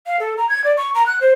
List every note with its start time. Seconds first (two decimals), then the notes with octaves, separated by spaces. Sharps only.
0.07 F5
0.20 A4
0.37 A#5
0.49 G#6
0.64 D5
0.77 C#6
0.95 A#5
1.06 F#6
1.21 C5